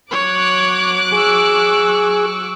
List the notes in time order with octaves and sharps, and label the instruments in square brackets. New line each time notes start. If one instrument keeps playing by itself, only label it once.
[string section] F#3 D6 F#6 [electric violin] C#5
[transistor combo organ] G#4 [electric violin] C#6 E6